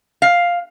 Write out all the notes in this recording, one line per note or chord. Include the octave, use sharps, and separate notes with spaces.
F5